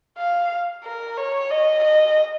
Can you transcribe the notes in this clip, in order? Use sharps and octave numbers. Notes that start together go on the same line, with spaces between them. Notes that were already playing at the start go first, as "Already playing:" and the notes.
F5
A#4
C#5
D#5
D#5